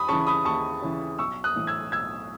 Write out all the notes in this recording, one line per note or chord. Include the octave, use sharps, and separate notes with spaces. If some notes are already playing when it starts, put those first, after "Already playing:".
Already playing: D#2 B5 D#6
C#3 E3 A5 C#6
B5 D#6
D#2 A5 C#6
C#3 E3
B1 C#6 E6
D#6 F#6
A2 E3
E6 G#6
B1 E6 G#6